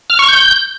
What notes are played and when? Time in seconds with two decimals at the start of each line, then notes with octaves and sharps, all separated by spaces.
0.10 F6
0.19 C#6
0.28 G6